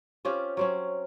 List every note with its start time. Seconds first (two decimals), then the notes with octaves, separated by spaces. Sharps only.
0.25 C4 C#4 F4 G4
0.57 F#3 C4 C#4